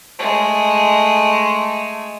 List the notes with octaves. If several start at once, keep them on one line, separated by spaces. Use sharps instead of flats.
G#3 A3